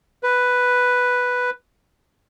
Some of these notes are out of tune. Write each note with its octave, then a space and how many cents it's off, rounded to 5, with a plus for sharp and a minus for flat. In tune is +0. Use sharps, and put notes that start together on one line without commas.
B4 +0